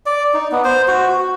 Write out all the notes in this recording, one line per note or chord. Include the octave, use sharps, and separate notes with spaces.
D5
D#4
B3
C5
F#4
F#4